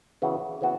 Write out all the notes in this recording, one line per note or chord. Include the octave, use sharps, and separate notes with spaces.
C#3 E3 B3 F#4
C#3 E3 B3 F#4